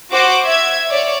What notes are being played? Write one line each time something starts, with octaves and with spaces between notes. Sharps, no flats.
F#4 C5 D6
E5 G#6
C#5 D5